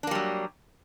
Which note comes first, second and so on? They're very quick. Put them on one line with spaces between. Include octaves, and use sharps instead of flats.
D4 A#3 G3 F#3